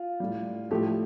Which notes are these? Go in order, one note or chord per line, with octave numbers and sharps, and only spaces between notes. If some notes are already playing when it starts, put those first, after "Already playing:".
Already playing: F4
A2 G3
A2 F3 A3 G4